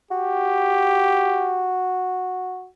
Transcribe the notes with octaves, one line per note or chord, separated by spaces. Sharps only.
F#4 G4